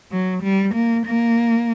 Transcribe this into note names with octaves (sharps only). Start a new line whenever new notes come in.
F#3
G3
A#3
A#3